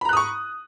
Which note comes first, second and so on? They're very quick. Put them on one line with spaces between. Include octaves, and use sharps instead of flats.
B5 A#5 F#6 D#6 C#6